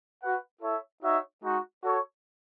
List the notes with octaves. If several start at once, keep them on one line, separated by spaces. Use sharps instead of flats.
F#4 B4 F#5
E4 A4 C#5 E5
D#4 F#4 C#5 E5
G#3 D#4 F#4
F#4 A4 C#5